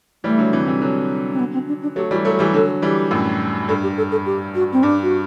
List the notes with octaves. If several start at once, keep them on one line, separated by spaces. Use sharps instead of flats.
E3 G3 A3
D3 F#3
C3 E3
C3 E3
D3 F#3
C4
B3
C4
D4
D4
F#3 A3 G4
E3 G3 F#4
F#3 A3 A4
E3 G3 G4
D3 F#3 A4
E3 G3 G4
F#2 A2
G2 A4
G4
A4
A4
G4
F#4
C4
G2 D4
F#4